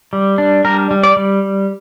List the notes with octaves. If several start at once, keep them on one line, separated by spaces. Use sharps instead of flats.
G3
D4
G3 A#4
G3
D5
G3